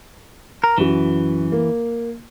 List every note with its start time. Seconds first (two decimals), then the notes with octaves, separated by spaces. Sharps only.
0.64 A#4
0.78 F#2 E3 F#4
1.52 A#3